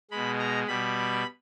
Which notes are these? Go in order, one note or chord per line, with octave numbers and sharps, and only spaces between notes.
B2 G#3 B5
A#5
B2 G3 B5